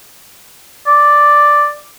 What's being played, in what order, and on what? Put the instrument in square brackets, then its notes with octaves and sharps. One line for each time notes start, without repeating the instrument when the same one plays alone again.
[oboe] D5